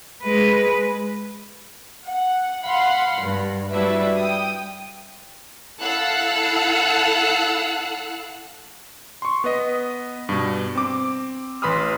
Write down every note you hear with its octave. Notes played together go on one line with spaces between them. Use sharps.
G#3 B4
F#5
F5 F#5 B5 C6
G2
G3 D4 E4 F#4 B4 E5
G5 D#6
E4 A4 F5 F#5 E6 F#6
C6 C#6
B3 B4 D#5
G2 B2
C4 D6
A1 B4 B5 C6 D#6 F6